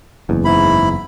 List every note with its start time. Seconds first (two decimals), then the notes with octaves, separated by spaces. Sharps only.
0.29 F#1 E2
0.45 G#2 E4 B5